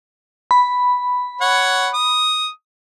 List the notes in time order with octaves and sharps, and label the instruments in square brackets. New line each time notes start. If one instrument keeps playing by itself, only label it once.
[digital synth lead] B5
[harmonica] C#5 F#5
D#6